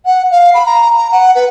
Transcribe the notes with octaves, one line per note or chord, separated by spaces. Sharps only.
F#5
F5
B5
A#5
A#5
F#5
B4